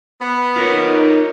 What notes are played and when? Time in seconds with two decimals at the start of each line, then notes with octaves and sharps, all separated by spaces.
0.21 B3
0.56 D#4 F4 A#4 C#5